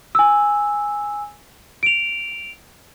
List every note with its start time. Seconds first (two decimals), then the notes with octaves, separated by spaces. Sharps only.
0.15 G#5 E6
1.83 D7 F7